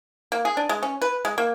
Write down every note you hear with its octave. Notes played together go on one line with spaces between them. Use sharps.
A#3
G#4
D4
G#3
C#4
B4
G#3
A#3